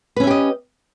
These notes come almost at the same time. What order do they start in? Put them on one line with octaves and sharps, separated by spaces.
B4 C#4 E5 G4 D#5